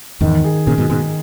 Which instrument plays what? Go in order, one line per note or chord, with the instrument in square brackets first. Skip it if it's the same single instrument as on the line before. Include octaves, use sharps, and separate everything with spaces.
[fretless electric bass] E2 G#2 [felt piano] D#3
[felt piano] G#4
[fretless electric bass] A#2 C#3 [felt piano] G#4
[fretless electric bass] G#2 B2
[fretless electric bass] G#2 B2 [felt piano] G#3